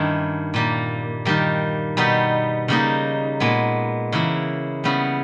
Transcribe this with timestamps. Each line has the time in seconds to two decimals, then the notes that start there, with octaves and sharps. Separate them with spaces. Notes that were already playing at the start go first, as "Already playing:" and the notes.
Already playing: G2 D#3 A#3 C#4 E4
0.54 A#2 G3 A#3
1.25 D#3 G3 A#3
1.97 B2 G3 B3 D#4
2.68 C#3 G3 A#3 D#4
3.40 A#2 G#3 B3
4.12 C#3 E3 A#3 E4
4.84 C#3 G3 B3 E4